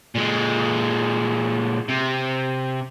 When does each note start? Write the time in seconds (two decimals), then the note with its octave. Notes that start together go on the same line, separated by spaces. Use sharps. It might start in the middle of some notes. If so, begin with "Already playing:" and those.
0.15 A#2 G#3
1.88 C3